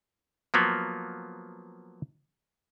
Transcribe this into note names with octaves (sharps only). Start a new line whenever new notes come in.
F3 F#3 A#3 B3